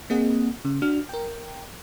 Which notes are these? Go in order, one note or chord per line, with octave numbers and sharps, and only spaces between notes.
A#3 C4 G#4 D#5 F#5
C#3
D4 F#4 F6
A#4 G5